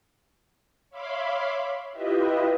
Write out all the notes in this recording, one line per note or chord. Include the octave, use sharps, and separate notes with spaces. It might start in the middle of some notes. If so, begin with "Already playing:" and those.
C#5 E5 F5 B5 C6 D6
E4 F4 G4 B4 D#5 E5